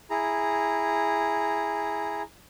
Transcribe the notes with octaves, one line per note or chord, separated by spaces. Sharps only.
E4 G#4 A#5